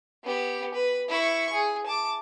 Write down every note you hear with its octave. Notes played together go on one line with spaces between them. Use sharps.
B3 G4
B4
E4 C#6
G#4
A5 D6